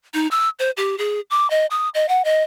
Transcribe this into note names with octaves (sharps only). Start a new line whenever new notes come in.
D#4
E6
C5
G4
G#4
D6
D#5
D#6
D#5
F#5
D#5